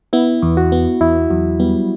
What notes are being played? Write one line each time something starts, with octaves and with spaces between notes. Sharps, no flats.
B3 E4
E2
F#4
B3
E2 E4
E2 F#3
G3 B3